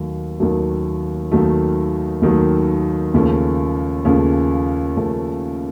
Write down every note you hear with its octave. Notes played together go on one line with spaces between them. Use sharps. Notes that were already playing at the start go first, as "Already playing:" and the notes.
Already playing: D#2 D#3 F#3 A3
D#2 D#3 F#3 A3
D#2 D#3 F#3 A3
D#2 D#3 F#3 A3
D#2 C#3 F3 A3 C#4
D#2 C#3 F3 A3 C#4
D#2 C#3 F3 A3 C#4